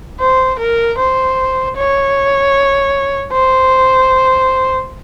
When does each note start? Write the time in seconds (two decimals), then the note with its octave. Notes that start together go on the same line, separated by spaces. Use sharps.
0.20 C5
0.59 A#4
0.98 C5
1.77 C#5
3.32 C5